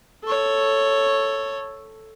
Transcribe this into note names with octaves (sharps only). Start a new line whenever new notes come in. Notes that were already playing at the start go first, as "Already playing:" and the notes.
A4 C#5